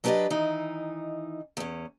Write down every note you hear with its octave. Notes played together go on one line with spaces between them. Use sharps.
F#3 D4 G4 B4 D5 D#5
D#3 E3 D#4
E2 C#4